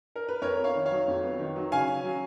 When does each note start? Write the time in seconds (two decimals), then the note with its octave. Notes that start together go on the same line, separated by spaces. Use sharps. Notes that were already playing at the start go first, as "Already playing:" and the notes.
0.16 A#4
0.29 B4
0.42 F2 A#4 C#5
0.58 B3
0.64 C#5 F5
0.75 D#3
0.86 C#5 F5
0.91 F#3
1.08 F2
1.23 B3
1.39 D#3
1.56 F#3
1.72 C#3 F5 G#5
1.88 C#4
2.05 F#3